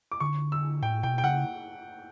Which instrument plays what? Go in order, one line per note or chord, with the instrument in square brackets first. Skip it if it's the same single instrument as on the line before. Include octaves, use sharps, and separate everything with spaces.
[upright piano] D6
[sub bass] D3 [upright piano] C#6
[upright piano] E6
[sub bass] A2 [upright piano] G5
[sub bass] B2 [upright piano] G5
[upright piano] G5
[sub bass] C#3 [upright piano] F#5